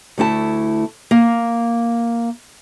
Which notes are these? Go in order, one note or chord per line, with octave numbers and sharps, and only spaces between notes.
D2 A3 E4 A5
A#3